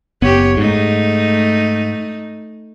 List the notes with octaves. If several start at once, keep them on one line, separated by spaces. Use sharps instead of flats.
F#1 B3 G4 C#5
G#2 A3 D#4